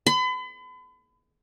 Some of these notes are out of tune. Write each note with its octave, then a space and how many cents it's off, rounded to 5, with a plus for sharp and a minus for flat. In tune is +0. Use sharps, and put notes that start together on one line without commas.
B5 +40